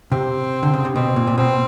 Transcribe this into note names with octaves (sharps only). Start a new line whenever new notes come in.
C3 C4
D3
C#3
C3
B2 C4
A#2
A#2
B2 C4